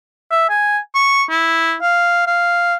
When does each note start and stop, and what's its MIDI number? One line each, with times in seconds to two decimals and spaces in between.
0.31 0.46 76
0.50 0.78 80
0.95 1.23 85
1.30 1.75 64
1.82 2.22 77
2.27 2.75 77